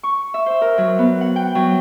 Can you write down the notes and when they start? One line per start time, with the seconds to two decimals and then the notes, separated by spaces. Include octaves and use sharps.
0.03 C#6
0.34 E5
0.46 C5
0.61 A#4
0.78 F#3
0.99 B3
1.21 F#5
1.36 G5
1.55 F#3